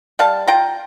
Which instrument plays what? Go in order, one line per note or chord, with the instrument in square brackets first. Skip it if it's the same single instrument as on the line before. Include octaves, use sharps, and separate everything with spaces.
[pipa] G3 F5 A5
F4 G5 A#5